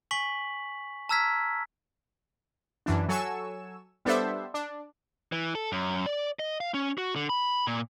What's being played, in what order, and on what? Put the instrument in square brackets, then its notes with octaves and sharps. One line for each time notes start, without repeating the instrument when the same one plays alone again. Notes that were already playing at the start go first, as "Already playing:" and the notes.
[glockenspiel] G#5 C#6 B6 F#7
A5 A#5 E6 F6 G#6 B6
[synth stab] F#2 E3 D4
F#3 A4 G#5 C#6 E6 E7
G3 B3 D4 A4 C5 E5
D4
[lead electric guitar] E3
A4
F#2
D5
D#5
F5
C#4
F#4
D3
B5
A#2